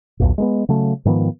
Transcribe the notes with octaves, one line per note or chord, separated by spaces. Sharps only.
B1 E2 A#2
G#3 A#3 B3
C#3 F#3 A3
G#2 D#3 F3 B3